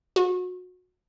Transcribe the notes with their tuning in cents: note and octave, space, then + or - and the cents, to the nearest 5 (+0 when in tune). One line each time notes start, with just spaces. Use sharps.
F#4 -30